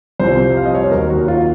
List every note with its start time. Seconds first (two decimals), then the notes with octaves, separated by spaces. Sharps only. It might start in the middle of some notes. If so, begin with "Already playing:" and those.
0.20 C2 C3 F3 C5
0.57 F5
0.66 D#5
0.74 C#5
0.84 C5
0.91 D#2 D#3 F#3 A#4
1.10 F#4
1.28 F4